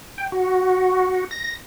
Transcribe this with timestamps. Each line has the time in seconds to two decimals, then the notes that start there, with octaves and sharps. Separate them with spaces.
0.18 G5
0.32 F#4
1.31 A#6